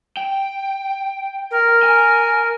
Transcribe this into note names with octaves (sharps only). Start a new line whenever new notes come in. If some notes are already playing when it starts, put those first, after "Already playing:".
G5
A#4
G#5